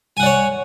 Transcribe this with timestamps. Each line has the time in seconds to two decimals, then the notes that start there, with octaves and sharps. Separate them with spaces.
0.17 G#5
0.20 F#5
0.23 D5
0.26 C#5